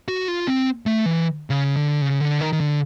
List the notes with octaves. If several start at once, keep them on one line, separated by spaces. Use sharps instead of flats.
F#4
F4
C4
A3
E3
C#3
D3
C#3
D3
D#3
D#3
D3